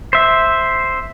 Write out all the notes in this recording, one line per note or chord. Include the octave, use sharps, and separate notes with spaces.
C5 E5